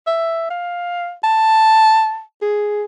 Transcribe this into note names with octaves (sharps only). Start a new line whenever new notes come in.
E5
F5
A5
G#4